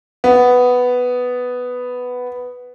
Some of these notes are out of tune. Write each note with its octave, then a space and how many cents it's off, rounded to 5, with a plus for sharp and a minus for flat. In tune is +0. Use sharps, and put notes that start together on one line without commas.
B3 +5